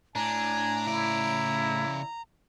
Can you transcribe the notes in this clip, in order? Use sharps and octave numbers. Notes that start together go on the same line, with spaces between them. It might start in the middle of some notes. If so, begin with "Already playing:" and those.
A2 D4 G#5 A#5
C#3 E4 D5